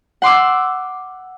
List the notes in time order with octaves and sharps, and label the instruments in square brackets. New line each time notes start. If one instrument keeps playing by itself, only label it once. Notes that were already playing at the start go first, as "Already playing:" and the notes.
[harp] F#5 C6 D6 E6